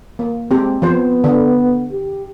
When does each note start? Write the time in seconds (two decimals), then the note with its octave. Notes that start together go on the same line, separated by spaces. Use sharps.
0.19 A#3
0.51 G#3 C4 G4
0.82 F3 B3 C5
1.24 D3
1.92 G4